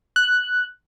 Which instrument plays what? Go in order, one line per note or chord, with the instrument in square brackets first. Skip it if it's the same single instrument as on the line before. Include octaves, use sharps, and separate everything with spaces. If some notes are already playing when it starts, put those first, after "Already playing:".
[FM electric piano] F#6